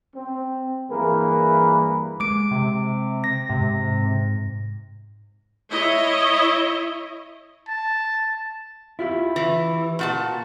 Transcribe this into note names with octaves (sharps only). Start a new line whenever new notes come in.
C4
G2 E3 A#3 G#4 A#4 B4
G#3 D6 D7
C3
A#6
G#2 C3
E4 C#5 D#5 E5
A5
E4 F4 G4
E3
A#2 F#4 A5